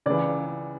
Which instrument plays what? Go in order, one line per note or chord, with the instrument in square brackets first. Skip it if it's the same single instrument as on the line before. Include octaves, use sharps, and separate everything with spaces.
[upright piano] C#2 C#3 E3 D5